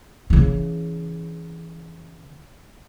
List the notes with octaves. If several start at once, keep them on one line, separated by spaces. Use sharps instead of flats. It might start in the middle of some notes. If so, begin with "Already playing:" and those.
C#3 E3